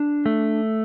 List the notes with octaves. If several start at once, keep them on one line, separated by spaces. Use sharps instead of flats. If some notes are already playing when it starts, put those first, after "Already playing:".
Already playing: D4
A3